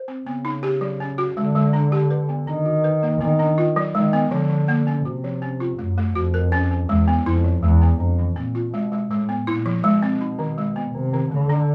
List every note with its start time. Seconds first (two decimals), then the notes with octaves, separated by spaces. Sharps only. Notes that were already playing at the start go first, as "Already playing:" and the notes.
Already playing: C5
0.08 C4
0.26 C#3 B3
0.45 D#4
0.63 G4
0.81 F#3
1.00 C#4
1.18 F#4
1.36 D3 G#3
1.55 G#3
1.73 D4
1.92 G4
2.10 B4
2.29 B3
2.47 D#3 D4
2.65 F#4
2.84 B4
3.03 A#3
3.21 D#3 B3
3.39 D4
3.58 F4
3.76 F#3
3.95 D#3 G#3
4.13 B3
4.31 D3 F3
4.50 F3
4.68 A#3
4.87 C#4
5.05 C3 F#4
5.24 F3
5.42 C#4
5.60 F4
5.78 F#2 A3
5.98 A3
6.15 F2 F#4
6.34 A#4
6.52 C#4
6.71 C#4
6.89 E2 G#3
7.08 B3
7.26 F2 E4
7.44 F3
7.63 E2 G#3
7.81 B3
8.00 F2 D4
8.18 E3
8.36 A#2 C4
8.55 F4
8.73 B2 G#3
8.92 G#3
9.11 A2 G#3
9.29 B3
9.47 A#2 E4
9.66 F3
9.84 B2 G#3
10.03 C4
10.21 D#4
10.39 D#3
10.58 G#3
10.76 B3
10.94 C3 D#3
11.13 D#3
11.31 D3 A3
11.49 D4